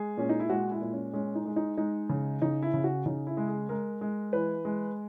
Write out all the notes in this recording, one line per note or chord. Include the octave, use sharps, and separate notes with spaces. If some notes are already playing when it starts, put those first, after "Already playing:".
Already playing: G#3 G#4
A#2 C#4
D#4
E4
G#3 F#4
E4
A#2
C#4
G#3 C#4
D#4
G#3
D#4
G#3 D#4
C#3
C#3 D#4
E4
C#3
F#4
C#3 D#4
E4
G#3
G#4
G#3 A#4
G#3
E3 B4
G#3